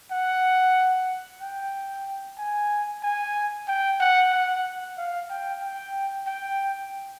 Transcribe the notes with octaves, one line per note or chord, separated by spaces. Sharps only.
F#5
G5
G#5
G#5
G5
F#5
F#5
F5
G5
G5
G5